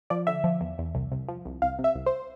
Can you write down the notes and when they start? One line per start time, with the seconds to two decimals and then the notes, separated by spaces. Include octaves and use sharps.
0.10 F3 D5
0.27 D3 E5
0.44 F3
0.60 E2
0.78 E2
0.95 C2
1.12 C2
1.28 F3
1.45 C2
1.62 C2 F5
1.79 C3
1.84 E5
1.95 C2
2.06 C5